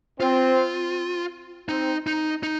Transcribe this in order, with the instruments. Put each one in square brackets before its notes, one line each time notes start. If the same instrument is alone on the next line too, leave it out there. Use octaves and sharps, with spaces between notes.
[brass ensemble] C4 [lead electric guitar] F4
[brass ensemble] C4 [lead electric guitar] D#4
[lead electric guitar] D#4
D#4